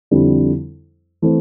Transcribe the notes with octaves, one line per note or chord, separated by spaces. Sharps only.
F2 D3 G3 C4 E4
E3 A3 C4